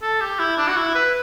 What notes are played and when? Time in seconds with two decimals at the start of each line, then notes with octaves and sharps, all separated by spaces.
0.02 A4
0.21 G4
0.39 E4
0.58 D4
0.67 F#4
0.77 E4
0.95 B4